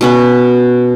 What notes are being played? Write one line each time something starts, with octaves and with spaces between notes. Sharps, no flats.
B2 C#4 B4